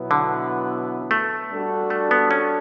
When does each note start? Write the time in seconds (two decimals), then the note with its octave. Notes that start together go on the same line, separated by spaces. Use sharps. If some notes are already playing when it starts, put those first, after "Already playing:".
Already playing: B2 F#3 B3 E4 B4
0.11 D3
1.11 A3
1.51 G3 D4 F#4 A4
1.90 A3
2.11 B3
2.31 C#4